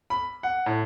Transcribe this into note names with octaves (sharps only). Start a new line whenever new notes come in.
B5
F#5
A2